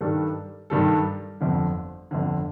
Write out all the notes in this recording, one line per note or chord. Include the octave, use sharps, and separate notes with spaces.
G2 D#3 G3 D4 A4
G2 D#3 G3 D4 A4
G1 F2 D3
G1 F2 D3